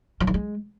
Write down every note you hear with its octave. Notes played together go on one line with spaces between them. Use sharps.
F3
E3
G#3